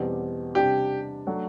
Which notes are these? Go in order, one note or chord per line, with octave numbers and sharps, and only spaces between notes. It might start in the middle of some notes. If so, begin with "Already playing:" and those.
Already playing: E2 B2 G3 C4 G4
C3 G3 D4 G4
F#3 A3 D4